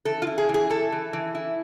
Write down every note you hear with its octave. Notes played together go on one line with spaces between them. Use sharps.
E3 A4
F4
E4
G#4
E3
G#4
E4 A4
E3
E3
E4